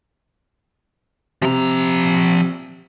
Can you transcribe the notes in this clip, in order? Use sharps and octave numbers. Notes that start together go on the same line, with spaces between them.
C3 F3 A#5